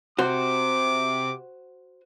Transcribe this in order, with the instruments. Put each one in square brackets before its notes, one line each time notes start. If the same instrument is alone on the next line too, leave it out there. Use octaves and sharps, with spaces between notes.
[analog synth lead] C3 [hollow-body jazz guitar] F#4 C5 [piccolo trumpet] D6